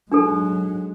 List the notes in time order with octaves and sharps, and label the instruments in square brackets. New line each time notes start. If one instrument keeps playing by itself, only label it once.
[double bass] F#3 G#3 [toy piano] D4 D#4 A4